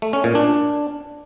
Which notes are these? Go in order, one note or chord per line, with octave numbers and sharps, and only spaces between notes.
A3
C#4
A#2
D4